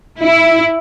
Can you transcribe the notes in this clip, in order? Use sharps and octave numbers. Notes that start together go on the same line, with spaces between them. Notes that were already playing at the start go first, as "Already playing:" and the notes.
E4